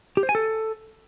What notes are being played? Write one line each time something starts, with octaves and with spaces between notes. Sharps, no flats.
G4
C5
G#5
A4